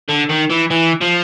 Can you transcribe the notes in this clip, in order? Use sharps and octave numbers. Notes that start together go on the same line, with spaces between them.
D3
D#3
E3
E3
F3